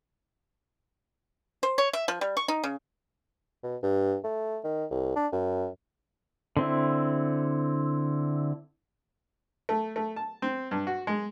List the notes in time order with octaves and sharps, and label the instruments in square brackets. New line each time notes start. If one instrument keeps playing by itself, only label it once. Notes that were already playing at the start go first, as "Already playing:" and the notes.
[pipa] C5
C#5
E5
F3
G3
C#6
D#4
C#3
[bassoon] B2
G2
A3
D#3
C2
D4
F#2
[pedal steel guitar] D3 C4 E4
[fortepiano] A3
A3
A5
C4
G2
F#4
G#3